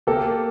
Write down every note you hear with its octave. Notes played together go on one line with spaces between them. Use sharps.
A#3 G4 A4